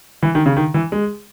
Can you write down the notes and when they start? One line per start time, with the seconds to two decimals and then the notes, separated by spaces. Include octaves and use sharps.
0.23 E3
0.35 D#3
0.46 C#3
0.57 D#3
0.74 E3
0.92 G#3